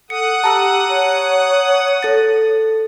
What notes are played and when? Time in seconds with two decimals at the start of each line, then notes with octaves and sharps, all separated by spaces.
0.10 A4 F#5 D#6 C#7
0.44 G4 A5 A#5 E6
0.89 C#5
2.03 A4 A6